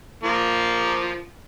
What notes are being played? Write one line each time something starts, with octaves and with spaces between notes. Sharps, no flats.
F3 A#3